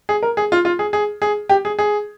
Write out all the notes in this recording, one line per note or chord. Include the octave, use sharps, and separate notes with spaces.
G#4
A#4
G#4
F4
F4
G#4
G#4
G#4
G4
G#4
G#4